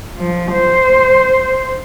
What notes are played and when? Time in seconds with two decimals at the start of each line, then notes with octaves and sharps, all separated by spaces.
0.18 F3
0.53 C5